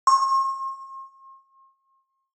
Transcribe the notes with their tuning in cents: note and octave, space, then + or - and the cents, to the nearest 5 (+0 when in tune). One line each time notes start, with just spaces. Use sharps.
C6 +45